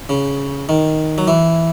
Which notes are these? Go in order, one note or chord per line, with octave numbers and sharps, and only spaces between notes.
C#3
D#3
F#3
E3